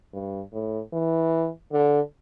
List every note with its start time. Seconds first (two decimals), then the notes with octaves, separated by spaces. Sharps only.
0.13 G2
0.52 A2
0.93 E3
1.72 D3